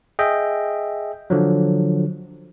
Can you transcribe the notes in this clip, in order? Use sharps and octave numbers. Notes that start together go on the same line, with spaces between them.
G#4 D#5 E5 G5
D3 F3 F#3